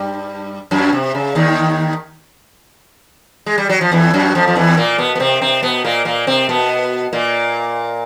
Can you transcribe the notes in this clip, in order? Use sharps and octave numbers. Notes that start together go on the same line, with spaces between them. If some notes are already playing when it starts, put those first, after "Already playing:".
Already playing: G2 G3
F#2 F#3
C3
C#3
D#2 D#3
G#3
G3
F#3
F3
E2 E3
F#2 F#3
F2 F3
F3
E2 E3
A#2 A#3
B2 B3
B3
C3 C4
C3 C4
B2 B3
A#2 A#3
A#2 A#3
C3 C4
B2 B3
A#2 A#3